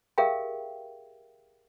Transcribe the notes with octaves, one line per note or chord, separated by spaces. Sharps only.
G4 G#4 A#4 E5 F5 G5